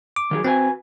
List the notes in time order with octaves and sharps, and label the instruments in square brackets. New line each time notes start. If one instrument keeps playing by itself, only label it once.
[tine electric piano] D6
[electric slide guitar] D#3 F#3 G#4
[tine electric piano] C4 [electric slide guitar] F#4 B4 G#5